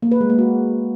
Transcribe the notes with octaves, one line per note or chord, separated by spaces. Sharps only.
A#3
B4
G#3
A#3
F#4